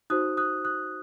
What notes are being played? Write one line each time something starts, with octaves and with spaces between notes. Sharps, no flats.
D#4 F#4 C5 D#6 F#6
D#6 F#6
D#6 F#6